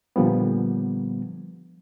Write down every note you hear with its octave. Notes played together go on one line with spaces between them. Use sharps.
A#2 D3 F3 G3 B3